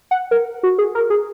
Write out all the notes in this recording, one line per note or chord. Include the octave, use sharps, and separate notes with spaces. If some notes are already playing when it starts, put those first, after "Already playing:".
F#5
A#4
F#4
G#4
A#4
G#4